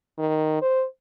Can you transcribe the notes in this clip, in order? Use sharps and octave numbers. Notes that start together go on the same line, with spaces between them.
D#3
C5